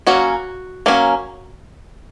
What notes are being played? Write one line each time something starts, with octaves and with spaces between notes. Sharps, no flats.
F#3 A#3 C#4 F#4
F#3 A#3 C#4